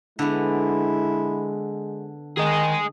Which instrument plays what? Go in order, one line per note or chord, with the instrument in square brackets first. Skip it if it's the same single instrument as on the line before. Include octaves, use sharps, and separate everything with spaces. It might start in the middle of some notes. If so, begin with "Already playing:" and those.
[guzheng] D3 B3 [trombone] G#3 [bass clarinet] E4
[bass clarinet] D#3 [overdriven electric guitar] G#4 D#5